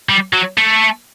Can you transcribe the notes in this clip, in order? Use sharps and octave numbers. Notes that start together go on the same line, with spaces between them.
G3
F#3
A3